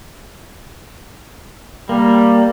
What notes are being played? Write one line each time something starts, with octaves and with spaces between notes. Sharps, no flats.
G3 A#3